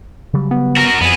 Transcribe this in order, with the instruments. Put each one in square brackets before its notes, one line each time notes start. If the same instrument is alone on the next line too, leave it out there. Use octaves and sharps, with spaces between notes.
[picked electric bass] C#3 F#3 G3
[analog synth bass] B3
[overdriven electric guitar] F#4 A#4
[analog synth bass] F2 [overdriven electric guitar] B3 G#4